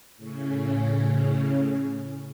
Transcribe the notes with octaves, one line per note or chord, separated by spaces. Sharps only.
A2 C#3 C#4